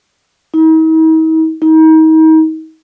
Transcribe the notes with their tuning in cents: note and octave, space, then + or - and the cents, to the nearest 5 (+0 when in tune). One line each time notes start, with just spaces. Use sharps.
D#4 +45
D#4 +35